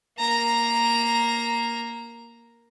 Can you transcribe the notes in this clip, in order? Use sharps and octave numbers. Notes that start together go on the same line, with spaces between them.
A#3 A#5